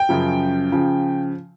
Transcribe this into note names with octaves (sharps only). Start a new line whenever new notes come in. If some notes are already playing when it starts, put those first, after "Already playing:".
Already playing: G5
F#2 C#3 F3
C#3 F3